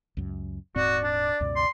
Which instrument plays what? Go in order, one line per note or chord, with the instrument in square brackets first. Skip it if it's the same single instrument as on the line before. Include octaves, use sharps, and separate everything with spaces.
[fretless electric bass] C#2 F#2
[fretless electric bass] D#1 G#2 C4 [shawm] F#4 [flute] D5
[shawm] D4
[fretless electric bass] C#2 F#2 B2
[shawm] C6